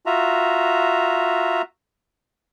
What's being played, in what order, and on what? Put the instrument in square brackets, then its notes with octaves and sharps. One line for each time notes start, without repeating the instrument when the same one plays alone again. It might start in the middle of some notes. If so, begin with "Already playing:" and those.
[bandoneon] F4 F#4 E5 A#5